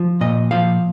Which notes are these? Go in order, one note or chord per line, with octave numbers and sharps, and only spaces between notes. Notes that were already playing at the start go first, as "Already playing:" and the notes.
Already playing: F3
A#2 D#5
F3 F5